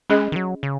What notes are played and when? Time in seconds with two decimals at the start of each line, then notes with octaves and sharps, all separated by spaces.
0.10 G#3 C#4 G#4 D#5
0.32 D#3
0.36 F#3
0.63 C#3